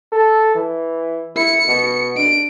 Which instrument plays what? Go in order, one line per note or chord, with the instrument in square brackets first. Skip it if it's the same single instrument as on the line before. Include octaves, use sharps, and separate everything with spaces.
[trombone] A4
E3
[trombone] E4 [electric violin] C#7
[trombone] B2
[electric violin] D4 D7